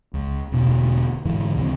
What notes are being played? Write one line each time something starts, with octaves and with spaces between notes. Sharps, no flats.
C#2
E1 B2 D3
G#2 D3 E3
C#2 C3 E3